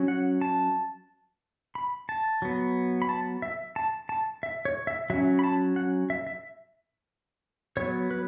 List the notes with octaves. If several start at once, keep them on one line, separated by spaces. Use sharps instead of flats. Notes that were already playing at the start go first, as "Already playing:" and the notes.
Already playing: F#3 C#4
F#5
A5
B5
A5
F#3 B3
B5
A5
E5
A5
A5
E5
C#5
E5
F#3 C#4 E5
B5
A5
F#5
E5
E5
F#3 B3 C#5
B4